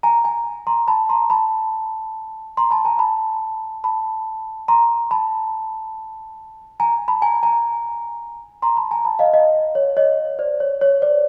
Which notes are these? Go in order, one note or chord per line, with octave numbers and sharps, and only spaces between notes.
G#5 A#5
G#5 A#5
A#5 C6
A5 B5
A#5 C6
A5 B5
A#5 C6
A5 B5
G#5 A#5
A5 B5
A5 B5
A#5 C6
A5 B5
G#5 A#5
A5 B5
G#5 A#5
G#5 A#5
A#5 C6
A5 B5
G#5 A#5
A5 B5
D#5 F5
D#5 F5
C#5
C#5 D#5
C5 D5
C#5
C#5
C5 D5